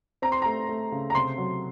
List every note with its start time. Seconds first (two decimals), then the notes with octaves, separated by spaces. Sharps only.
0.22 C4 A#5
0.32 C6
0.42 A3 A#5
0.69 A3
0.92 C#3
1.10 A#5
1.15 C3 C6
1.38 F#3